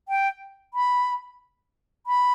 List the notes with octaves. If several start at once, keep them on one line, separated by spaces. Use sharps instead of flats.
G5
B5
B5